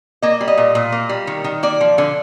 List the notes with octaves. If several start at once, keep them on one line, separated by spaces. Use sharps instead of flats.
A#3 D#5
G3
D#5
A#2
A#2
A#3
G3
D#3
D#3
A#3 D5
F3
D3